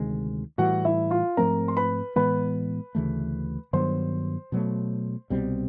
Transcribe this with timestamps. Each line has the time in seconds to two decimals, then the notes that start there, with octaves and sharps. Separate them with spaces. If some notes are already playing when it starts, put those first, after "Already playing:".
Already playing: D2 C3 D#3 G#3
0.58 A2 E3 G3 F#4 F#5
0.85 E4 E5
1.11 F4 F5
1.37 G#2 F3 A3 C4 A#4 A#5
1.68 C6
1.77 B4 B5
2.16 A2 E3 G#3 B3 B4 B5
2.95 D2 C#3 E3 A3
3.73 G2 D#3 F#3 B3 C5 C6
4.52 B2 F#3 A3
5.30 C2 B2 G3 C4